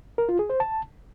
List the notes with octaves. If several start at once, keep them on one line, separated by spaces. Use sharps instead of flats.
A#4
F4
G#4
C5
A5